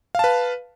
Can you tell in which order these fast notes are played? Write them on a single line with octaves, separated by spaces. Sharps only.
F5 A5 B4